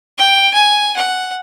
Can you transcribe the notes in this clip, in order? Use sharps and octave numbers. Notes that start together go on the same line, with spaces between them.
G5
G#5
F#5